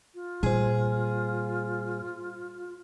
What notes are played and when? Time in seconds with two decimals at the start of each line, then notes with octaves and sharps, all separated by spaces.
0.14 F4
0.43 A#2 G3 G#4 C5